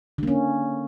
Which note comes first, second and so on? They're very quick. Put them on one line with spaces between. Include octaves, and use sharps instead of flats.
D3 A#3 C#4